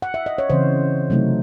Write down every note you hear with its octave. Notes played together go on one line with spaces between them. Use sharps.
F#5
E5
D#5
C#5
C#3 E3 C4 C5
C3 F#3 A3 D#4